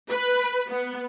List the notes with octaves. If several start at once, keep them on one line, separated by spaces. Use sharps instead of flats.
B4
B3